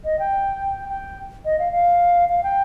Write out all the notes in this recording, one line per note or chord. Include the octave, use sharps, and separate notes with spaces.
D#5
G5
G5
D#5
F5
F5
F5
G5